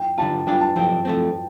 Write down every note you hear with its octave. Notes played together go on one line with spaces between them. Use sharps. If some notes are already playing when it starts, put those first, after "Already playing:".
Already playing: G5
D3 G3 F4 A5
G2 G3 D4 F4 D5 G5
A5
F2 F3 C4 G4 G5
F3 A3 C4